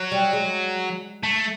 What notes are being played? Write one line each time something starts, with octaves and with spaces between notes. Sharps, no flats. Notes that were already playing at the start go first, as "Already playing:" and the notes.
Already playing: F#3
G3
G#3
A3